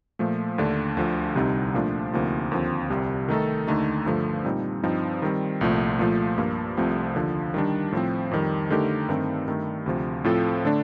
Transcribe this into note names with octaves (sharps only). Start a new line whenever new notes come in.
A#2 F3 A3
D#2 D3 A3 D4
D2 D3 F3
C2 C3 G3 C4 D#4
A#2 F3 A3 D4 F4
D2 C3 F3 A#3 D#4
D#2 D3 F3 C4
C2 C3 G3
D#3 A3 D#4 A4
D#2 D3 A3 D#4
G2 D3 F3 A3
A#2 G3 C4 D#4
G2 F3 C4 D#4
D#3 G3 C4
C2 A#2 F3 A3
A#2 F3 A3
G2 F3 A#3
C2 C3 F3 A3 C4
D#2 D3 F3
D#3 G3 D4
A2 F3 C4
F2 D#3 G3
D3 A3 D#4 G4 A#4
G2 D#3 A3 C4
G2 D#3 A3
D2 C3 F3
A2 F3 C4 F4 A4
D3 A3 D4